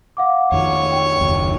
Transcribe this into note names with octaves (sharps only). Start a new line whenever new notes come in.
F5 F#5 D6
F2 D#3 F3 C#5
G5
F#1 D#2 B2